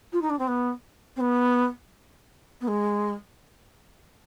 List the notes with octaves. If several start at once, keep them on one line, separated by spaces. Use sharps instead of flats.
F4
D#4
D4
C4
B3
C4
B3
B3
G#3